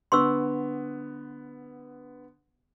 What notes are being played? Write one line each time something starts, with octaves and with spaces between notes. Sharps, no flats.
D3 B3 C6 C#6 E6